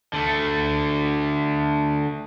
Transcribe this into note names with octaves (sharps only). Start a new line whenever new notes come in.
D3 A3